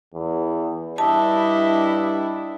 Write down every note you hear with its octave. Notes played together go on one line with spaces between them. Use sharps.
E2
G2 D4 E4 G4 D#5 E5 A5